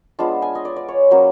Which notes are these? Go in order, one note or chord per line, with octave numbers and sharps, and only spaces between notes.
G#3 B3 D4 F4 A5
G#5
D#5
D5
D5
C#5
F#3 A#3 C#4 C5